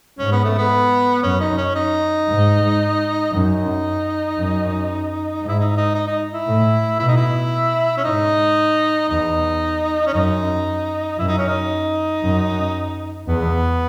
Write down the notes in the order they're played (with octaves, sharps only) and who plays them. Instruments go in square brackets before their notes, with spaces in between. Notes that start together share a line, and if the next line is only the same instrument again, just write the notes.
[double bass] G#2 [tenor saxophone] C#4
[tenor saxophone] B3
A3
B3
[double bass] F#2 [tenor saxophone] C#4
[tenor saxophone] D#4
C#4
D#4
[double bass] G#2
[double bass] F#2 [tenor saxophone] D#4
[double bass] F#2
G#2
[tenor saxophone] E4
D#4
D#4
D#4
D#4
E4
[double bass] A2
[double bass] B2 [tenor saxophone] E4
[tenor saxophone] D#4
E4
C#4
[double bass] G#2 [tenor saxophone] D#4
[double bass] E2 [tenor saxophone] D#4
[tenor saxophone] C#4
[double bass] F#2 [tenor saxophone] D#4
[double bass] F#2 [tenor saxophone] E4
[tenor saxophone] D#4
C#4
D#4
[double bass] F#2
[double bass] E2 [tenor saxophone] B3